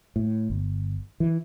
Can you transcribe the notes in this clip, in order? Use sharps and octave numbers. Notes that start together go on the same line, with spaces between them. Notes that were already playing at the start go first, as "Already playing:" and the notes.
A2
G1
E3